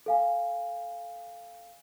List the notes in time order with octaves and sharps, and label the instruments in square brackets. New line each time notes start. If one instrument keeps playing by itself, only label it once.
[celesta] A4 F5 G#5